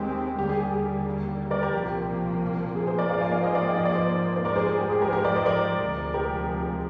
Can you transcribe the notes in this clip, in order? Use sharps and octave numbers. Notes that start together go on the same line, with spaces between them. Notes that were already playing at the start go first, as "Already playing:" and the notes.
Already playing: D#2 D#3 G#3 C4 G4
D#2 D3 G3 A#3 G4
G#4
G4
A#4 D5
G4 A#4
C2 A#2 F3 A#3 G4
G#4
G#4 C5
A#4 D5
G#2 F3 A#3 D5 F5
F5 G#5
D5 F5
C5 D#5
D5 F5
D#5 G5
D#5
D5
C5 D#5
C5
G#2 F3 G#3 A#4 D5
G#4 C5
G#4
G4
G#4
G4 A#4
C5
G4 A#4
A#4 D5
C5 D#5
A#4 D5
D2 C3 F3 G#3
G4 A#4